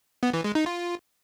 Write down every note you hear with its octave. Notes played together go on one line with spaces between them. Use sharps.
B3
E3
G#3
D#4
F4